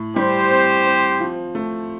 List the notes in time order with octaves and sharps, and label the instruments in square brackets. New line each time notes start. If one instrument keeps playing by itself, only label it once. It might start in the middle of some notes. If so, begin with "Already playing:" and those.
Already playing: [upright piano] A2
[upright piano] G3 [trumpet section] G4 C5
[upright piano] C4
C4
F3
A3